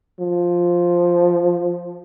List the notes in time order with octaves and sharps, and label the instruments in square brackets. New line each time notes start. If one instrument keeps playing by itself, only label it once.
[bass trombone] F3